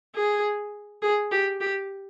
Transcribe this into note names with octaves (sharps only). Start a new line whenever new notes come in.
G#4
G#4
G4
G4